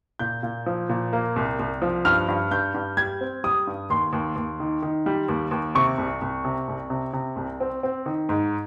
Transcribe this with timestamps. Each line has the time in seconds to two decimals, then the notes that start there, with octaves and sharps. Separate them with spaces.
0.19 A#2 G6
0.43 A#2
0.66 F3
0.89 A#2
1.13 A#3
1.36 C2
1.59 C2
1.82 F3
2.05 G2 F6
2.28 G2
2.51 G2 G6
2.74 G2
2.97 G3 G#6
3.21 C4
3.44 G3 D#6
3.67 G2
3.90 D#2 C6
4.13 D#2
4.36 D#2
4.60 D#3
4.82 D#3
5.06 G3
5.28 D#2
5.51 D#2
5.75 C3 C#6
5.98 C2
6.21 C2
6.45 C3
6.68 C2
6.90 C3
7.13 C3
7.36 C2
7.60 C4
7.83 C4
8.06 D#3
8.29 G#2